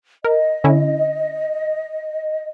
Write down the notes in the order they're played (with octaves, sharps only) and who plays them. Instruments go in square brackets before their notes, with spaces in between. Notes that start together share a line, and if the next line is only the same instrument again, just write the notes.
[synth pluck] A#4 [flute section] D#5
[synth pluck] D3 C#4 E4